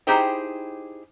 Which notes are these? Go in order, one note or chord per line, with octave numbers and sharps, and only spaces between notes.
D#4 E4 G4 G#4 C5 G5